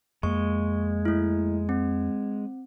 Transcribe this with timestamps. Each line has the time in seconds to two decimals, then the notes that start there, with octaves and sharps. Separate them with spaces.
0.23 F2 G#3 A#3 C#6
1.05 A3 E4
1.69 C4